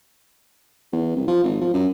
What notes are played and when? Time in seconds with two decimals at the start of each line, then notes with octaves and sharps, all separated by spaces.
0.93 E2
1.16 C2
1.28 F3
1.44 G#1
1.61 F3
1.74 F#2